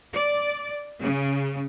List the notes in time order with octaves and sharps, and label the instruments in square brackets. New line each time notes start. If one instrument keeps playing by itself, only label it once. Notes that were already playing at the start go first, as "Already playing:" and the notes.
[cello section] D5
C#3